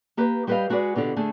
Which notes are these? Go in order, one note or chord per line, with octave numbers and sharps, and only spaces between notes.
A#3 G4 B4
G3 G4 B4 C5 D#5 F5
G#3 F#4 G#4 B4 D5
B2 D3 F4 G4
D3 A3 G#4